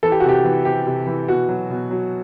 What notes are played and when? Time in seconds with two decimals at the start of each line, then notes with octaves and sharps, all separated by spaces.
0.03 E3 A4
0.12 G4
0.20 F#4
0.24 C3 G4
0.45 E3
0.65 C3 G4
0.87 C3
1.07 E3
1.28 B2 F#4
1.49 F#3
1.70 B2
1.91 F#3